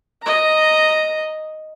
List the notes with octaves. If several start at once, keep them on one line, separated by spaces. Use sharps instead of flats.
D#5 A#5